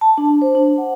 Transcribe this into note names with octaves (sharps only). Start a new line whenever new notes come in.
A5
D4
C5
D4
F#5